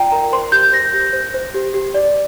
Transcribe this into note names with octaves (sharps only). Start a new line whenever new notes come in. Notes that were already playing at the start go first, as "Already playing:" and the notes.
Already playing: F4 D5 G5 A#5
A#4 A#5
C5 C6
G4 G6
C5 A#6
G4
C5
C5
G4
G4
D5